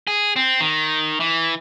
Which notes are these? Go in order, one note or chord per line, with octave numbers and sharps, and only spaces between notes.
G#4
C4
D#3
E3